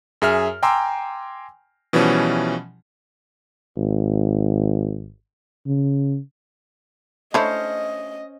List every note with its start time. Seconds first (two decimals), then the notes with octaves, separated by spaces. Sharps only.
0.22 F#2 G#4 E5 F6
0.63 G5 G#5 A#5 C6 D6 E6
1.93 B2 E3 F3 G3 C#4
3.77 G#1
5.66 C#3
7.34 A3 C#4 D4 E4 C5 C#5 D#5